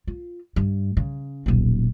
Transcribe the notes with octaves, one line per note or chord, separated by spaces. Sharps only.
F4
G2
C#3
D#1 B1